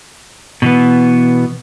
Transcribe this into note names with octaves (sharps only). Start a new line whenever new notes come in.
B2 E3 B3